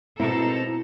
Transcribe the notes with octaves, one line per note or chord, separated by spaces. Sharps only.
G#1 B2 A3 C4 E4 A4 A#5